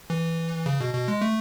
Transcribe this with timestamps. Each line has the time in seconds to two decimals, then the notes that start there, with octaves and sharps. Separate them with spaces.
0.10 E3
0.66 C#3
0.81 B2
0.94 B2
1.08 G#3
1.22 A3